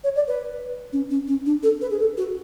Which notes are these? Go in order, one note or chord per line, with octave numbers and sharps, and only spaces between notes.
C#5
D5
B4
C#4
C#4
C#4
D4
A4
B4
G#4
A4
F#4